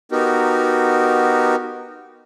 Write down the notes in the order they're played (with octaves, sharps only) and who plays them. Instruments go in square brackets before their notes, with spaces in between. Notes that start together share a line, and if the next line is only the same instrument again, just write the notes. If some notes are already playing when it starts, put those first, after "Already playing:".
[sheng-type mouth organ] B3 D#4 F#4 G4 A#4